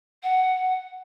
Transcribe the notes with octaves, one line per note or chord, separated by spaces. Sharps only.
F#5